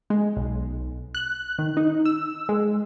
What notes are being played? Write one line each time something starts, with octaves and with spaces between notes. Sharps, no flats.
G#3
B1
F#6
D#3
D#4
E6
G#3